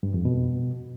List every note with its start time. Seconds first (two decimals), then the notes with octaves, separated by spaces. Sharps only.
0.03 G2
0.14 F2
0.25 B2